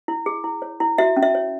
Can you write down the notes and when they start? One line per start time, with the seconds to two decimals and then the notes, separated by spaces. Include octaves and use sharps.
0.08 E4
0.26 G#4
0.44 E4
0.62 C#5
0.80 E4
0.98 F#4 E5
1.17 C#4
1.23 E5
1.35 C#5